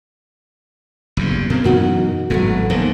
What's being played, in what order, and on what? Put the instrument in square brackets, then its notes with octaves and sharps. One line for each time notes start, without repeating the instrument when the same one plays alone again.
[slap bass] F#1 E2 G2
[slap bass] B2 C4 [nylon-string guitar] A#3
[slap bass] F#2 B2 E3 [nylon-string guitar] D#4 F#4 A#4
[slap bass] G#1 A2 [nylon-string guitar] F#3 A3 B3
[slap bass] D#2 B2 D#3 [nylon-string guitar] F3 G#3 A#3